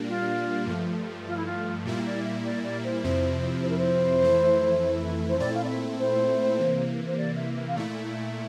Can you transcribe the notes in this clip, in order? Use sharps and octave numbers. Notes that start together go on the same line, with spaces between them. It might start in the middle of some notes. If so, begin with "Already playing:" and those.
Already playing: A#2 G3 A#3 D4
F4
G2 F3 A3
F4
E4
F4
A#2 G3 A#3 E4 F4
D5
E5
D5
D5
C5
F2 C3 F3 C4 E4 C5
C5
A#4
C5
F2 E3 A3 E4
C5
A#2 A3 C4 E4 D5
F5
D5
E5
C5
C3 E3 A#3
C5
D5
E5
E5
F5
A#2 A3 E4 E5